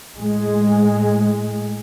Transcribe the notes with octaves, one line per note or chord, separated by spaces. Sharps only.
A2 G#3